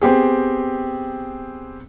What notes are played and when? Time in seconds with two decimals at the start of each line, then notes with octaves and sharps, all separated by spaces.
0.01 B3 C4 G4 G#4